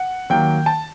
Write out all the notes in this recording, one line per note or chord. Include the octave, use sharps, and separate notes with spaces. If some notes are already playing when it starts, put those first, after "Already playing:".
Already playing: F#5
D#2 D#3 F#3 A#3 G5
A5